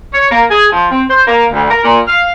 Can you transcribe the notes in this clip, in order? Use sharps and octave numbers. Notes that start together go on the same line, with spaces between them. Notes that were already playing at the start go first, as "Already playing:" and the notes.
C#5
A#3
G#4
F3
C4
C5
A#3
D2
A#4
A#2
F5